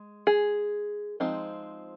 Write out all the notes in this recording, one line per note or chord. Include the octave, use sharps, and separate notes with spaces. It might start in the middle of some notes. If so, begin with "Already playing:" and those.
Already playing: G#3
G#4
F3 G#3 C4 D#4